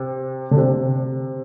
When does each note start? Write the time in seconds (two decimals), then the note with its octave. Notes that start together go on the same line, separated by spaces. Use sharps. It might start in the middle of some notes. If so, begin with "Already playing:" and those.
Already playing: C3
0.51 D3
0.57 C3